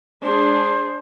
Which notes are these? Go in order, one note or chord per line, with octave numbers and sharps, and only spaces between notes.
G#3 D4 G#4 C5